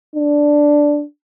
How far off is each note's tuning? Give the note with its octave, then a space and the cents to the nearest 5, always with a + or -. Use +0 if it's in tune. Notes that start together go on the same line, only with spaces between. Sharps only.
D4 +0